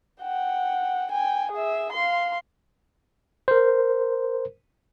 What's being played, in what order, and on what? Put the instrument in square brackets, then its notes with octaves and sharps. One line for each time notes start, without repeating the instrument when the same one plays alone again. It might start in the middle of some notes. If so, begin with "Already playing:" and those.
[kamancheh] F#5 G5
G5 G#5
G#4 E5
F5 C6
[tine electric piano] A#4 C5